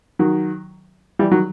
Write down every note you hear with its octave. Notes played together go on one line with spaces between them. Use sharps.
D#3 F#3
E3 G3
D#3 F#3